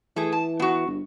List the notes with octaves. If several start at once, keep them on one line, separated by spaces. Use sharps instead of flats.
E3 A3 G#4
A5
B3 F#4
G1